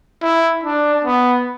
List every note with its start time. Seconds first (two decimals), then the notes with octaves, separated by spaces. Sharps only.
0.22 E4
0.63 D4
1.05 B3